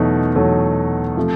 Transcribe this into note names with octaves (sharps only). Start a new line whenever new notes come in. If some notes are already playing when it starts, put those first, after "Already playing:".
Already playing: E2 B2 F#3 A3 D#4
E2 B2 F#3 A3
C3 F3 A3